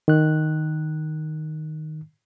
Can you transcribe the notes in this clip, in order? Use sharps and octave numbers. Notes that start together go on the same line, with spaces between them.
D#3 F#6